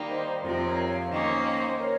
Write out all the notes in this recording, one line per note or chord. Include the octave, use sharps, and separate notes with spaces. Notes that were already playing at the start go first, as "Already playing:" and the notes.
Already playing: D#3 G3 A#3
C5 D#5
F2 C3 F3 C4 C5 D#5
C5
A#4 C#5
C#5 F5
C#5
D#3 A#3 C#4 C5 D#5
C5 D#5
A#4 C#5